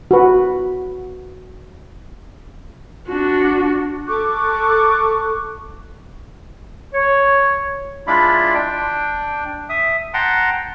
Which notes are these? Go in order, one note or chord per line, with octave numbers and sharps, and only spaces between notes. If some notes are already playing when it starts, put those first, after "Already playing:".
F#4 B4
D4 F#4
A4 C#6 D6 F#6
C#5
G#3 D4 E4 F4 D5 B5
D4 G5
E5 D#6
F#5 G5 A5 A#5 C6